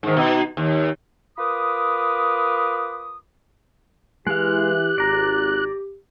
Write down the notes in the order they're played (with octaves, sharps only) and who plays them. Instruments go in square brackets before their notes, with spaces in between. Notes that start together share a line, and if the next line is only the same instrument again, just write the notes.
[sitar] G#2 D#3
B2 D#4
D#2
[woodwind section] F4 A#4 B4 B5 D6 D#6
[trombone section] E3 [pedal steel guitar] G#3 F5 [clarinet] G4 [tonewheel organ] F#6
[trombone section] G#1 [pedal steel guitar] D5 A#5